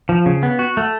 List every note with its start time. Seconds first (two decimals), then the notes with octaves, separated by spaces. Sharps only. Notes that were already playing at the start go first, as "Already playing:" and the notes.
0.09 F3
0.26 C#3
0.43 B3
0.59 F#4
0.77 A3